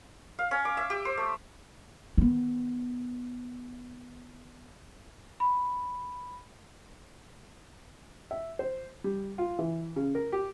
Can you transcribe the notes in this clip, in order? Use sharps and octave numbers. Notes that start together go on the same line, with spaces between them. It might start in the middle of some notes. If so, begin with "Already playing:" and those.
F5
C#4
D6
E5
G4
C5
A3
D#3 B3
B5
E5
C5
G3
F4
E3
C#3
A#4
G4